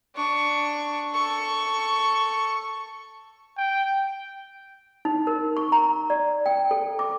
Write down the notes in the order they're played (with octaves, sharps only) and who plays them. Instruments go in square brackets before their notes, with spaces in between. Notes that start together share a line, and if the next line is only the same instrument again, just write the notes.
[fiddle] D4 C#6
A4 C#6
[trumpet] G5
[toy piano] D#4
A#4
C#6
A#5
D5
G5
A4
D6